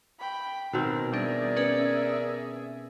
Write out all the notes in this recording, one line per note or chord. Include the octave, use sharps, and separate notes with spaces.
G5 B5
B2 D#3 C4 A#4
G3 D4 G#4 A#4 D5 E5
C#4 B4